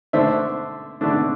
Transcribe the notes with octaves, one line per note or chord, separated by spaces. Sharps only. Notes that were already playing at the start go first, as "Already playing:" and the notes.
D3 A3 D4 C5 E5
D3 A3 D4